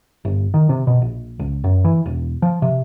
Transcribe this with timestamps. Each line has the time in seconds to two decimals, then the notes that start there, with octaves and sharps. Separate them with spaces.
0.25 G1
0.54 D#3
0.69 C3
0.87 B2
1.02 A#1
1.39 C#2
1.64 F#2
1.84 E3
2.06 E1
2.42 F3
2.62 C3